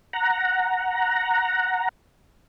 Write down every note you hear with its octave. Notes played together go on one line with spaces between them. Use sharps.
F#5 A#5